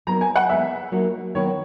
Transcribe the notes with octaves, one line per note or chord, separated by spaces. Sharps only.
F#3 B3 D#4 A#4 A#5
G#5
F#5
E3 G#3 B3 E5
F#3 A#3 D#4 F#4 C#5
D#3 F#3 B3 E4 C#5